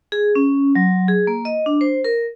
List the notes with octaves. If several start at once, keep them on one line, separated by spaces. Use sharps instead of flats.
G#4
C#4
F#3
G#4
A#3
D#5
D4
C5
A#4